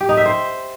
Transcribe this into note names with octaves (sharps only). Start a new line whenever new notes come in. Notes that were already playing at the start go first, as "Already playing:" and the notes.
G4
D#4
E5
C5